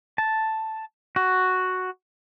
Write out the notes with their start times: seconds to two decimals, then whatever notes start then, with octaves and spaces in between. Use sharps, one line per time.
0.18 A5
1.16 F#4